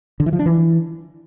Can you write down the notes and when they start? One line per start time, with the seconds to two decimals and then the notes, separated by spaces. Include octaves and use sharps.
0.20 D3
0.26 E3
0.33 F3
0.39 D4
0.46 E3